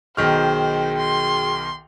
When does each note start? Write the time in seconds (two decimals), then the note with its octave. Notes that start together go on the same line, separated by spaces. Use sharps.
0.17 B1 D#3 F#4 G#4 C5 G5 F6
0.98 C6